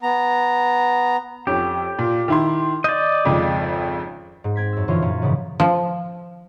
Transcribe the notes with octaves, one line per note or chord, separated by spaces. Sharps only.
B3 A#5
F2 C#4 G4
A#2
D#3 E4 C6
D5 D#5 G6
G#1 F2 C#3
G#2
C4 G#6 B6
F#2 E6
F#2 A#2 D3 E3 C#4 F4
F#2 A#2 C#4
G#2 C#3 E3 F3 D#4 E4
F3